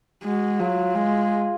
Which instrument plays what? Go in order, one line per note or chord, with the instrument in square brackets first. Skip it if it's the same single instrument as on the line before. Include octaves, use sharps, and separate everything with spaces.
[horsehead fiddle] G#3 [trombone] F#4
[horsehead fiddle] F#3 [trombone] F4
[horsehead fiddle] G#3